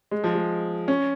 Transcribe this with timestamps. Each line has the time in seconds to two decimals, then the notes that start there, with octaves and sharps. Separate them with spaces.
0.11 G#3
0.24 F3
0.35 G#3
0.88 C#4